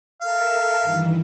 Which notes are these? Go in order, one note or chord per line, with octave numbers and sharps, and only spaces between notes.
A4 A#4 E5 F5
G2 D#3 E3